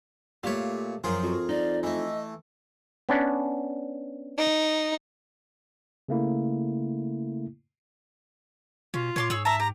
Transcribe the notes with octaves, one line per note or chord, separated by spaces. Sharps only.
A#2 A3 G4 C#5 F5
F#2 F3 F4 G#4 A#4
F2 F#4
D#4 D5
E3 A3 D#5
B3 C#4 D4
D#4
C#3 A3 A#3 E4
B2 C#4 F4
A#2 C#5 C6 D6
G#2 G#4 C#5 E6
E5 A5 A#5
G4 A#5